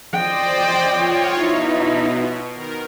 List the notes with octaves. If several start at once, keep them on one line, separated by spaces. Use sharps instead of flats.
C5 D5 D#5 G5
F4 C#5
B2 D#4 E4
D#3 A#4